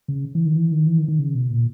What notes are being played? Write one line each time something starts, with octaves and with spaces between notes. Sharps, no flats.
C#3
E3
D#3
E3
D#3
E3
D#3
D#3
C#3
B2
A#2